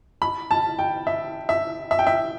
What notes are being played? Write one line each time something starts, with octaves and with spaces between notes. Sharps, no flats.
B5
A5
G5
E5
E5
E5
G5
E5